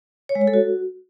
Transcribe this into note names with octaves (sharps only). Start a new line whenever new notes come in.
C#5
G#3
C#5
A4
F#4